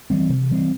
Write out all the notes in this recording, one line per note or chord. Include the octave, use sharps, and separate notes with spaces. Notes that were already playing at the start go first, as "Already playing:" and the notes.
E3 G3 C4
C3
E3 G3 C4